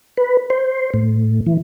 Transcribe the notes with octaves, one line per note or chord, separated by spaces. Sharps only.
B4
C5
A2
E3